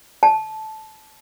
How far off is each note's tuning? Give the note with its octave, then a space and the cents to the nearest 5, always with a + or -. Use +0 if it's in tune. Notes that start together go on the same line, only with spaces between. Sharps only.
A5 -15